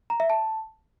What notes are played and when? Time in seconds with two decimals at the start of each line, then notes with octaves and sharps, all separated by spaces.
0.10 A#5
0.20 E5
0.30 A5